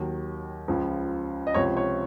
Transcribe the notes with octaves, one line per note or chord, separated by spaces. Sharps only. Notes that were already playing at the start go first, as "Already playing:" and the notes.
Already playing: D#2 D#3 F#3
C#2 C#3 F3
D#5
C#2 C3 F3 C#5
C#5